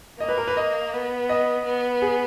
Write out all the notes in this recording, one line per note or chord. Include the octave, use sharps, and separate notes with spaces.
A#3 D#5
B4
A#4
B4
D#5
B3
D#5
B3
G#4